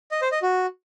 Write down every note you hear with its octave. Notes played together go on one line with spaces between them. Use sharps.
D#5
C5
D#5
F#4